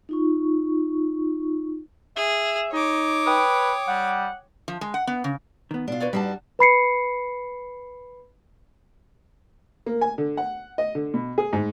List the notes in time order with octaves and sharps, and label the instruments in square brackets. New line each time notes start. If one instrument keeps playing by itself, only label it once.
[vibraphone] D#4 F4 C#6
[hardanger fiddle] G#4 [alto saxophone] E5
[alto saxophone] D#4 [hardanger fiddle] C#5 D6
[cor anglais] B4 [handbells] G5 D#6
[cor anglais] G3 [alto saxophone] F#5
[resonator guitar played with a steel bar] F3
G#3
F#5
B3
C#3
[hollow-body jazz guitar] D#3 B3
[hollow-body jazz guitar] B2 [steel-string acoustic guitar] D4 F4
[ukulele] B4 C#5 D5
[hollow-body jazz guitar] G2 [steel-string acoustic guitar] G3 F#4 A5 [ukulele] D4 D#4 B4
[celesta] B4 B5 C7 C#7
[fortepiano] A#3
G#5
D3
F#5
D#5
D3
B2
G#4
G#2